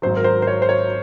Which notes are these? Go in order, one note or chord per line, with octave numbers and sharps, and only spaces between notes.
G#1 G#2 F#3 C5
A#4
C5
C5
C#5
C5
C#5